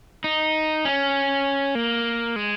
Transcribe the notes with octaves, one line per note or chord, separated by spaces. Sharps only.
D#4
C#4
A#3
G#3